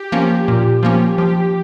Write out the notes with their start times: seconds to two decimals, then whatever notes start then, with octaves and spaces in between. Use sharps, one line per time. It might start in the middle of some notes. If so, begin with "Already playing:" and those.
Already playing: G4
0.12 F3 A#3 C#4
0.48 A#2
0.83 F3 A#3 C#4
1.18 F3 G4